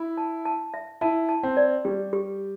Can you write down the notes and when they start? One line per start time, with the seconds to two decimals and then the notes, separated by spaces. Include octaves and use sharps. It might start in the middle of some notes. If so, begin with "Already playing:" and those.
Already playing: E4 B5
0.17 A5
0.45 A5
0.74 E5
1.01 E4 A5
1.29 A5
1.43 C4
1.57 D5
1.85 G3 G4
2.13 G4